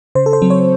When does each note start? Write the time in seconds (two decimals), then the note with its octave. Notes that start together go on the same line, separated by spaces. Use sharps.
0.15 C#3 C5
0.26 A4
0.33 C5
0.42 F#3 C4
0.50 C#5